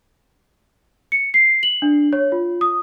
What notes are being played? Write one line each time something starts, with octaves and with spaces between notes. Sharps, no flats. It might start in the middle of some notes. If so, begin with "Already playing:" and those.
C#7
C7
F#7
D4
C#5
F4
D#6